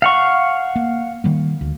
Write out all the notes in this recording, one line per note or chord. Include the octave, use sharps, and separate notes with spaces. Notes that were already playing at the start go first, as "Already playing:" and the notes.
F5 F#5 C#6
A#3
D#3 G3 A#3
D2